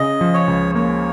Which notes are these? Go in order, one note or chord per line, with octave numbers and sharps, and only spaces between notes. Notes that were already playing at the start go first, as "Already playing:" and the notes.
Already playing: C#3 D#5
F3
C#5
C#2
A#3 C#5